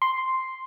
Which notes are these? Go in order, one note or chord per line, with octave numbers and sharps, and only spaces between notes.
C6